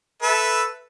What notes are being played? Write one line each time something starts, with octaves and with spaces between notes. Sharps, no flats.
A4 B4 E5